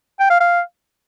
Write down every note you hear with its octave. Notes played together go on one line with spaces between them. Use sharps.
G5
F5
F5